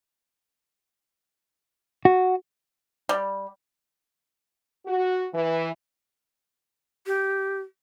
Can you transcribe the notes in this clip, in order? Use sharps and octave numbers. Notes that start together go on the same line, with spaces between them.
F#4
G3
F#4
E3
G4